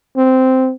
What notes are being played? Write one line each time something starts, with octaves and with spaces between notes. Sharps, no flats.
C4